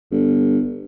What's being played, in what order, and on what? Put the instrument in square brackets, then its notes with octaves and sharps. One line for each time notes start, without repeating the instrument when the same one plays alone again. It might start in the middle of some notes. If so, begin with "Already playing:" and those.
[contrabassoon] G1